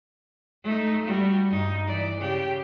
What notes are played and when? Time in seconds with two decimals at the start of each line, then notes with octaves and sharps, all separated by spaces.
0.64 A3 D#4
1.05 G3 F#4
1.51 G2 D#4
1.87 E3 D5
2.19 C#3 G4